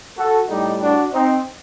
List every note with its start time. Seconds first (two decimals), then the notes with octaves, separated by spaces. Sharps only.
0.18 F#4 A4
0.49 A2 G3 D#4 G4
0.81 D4 F#4
1.13 C4 D#4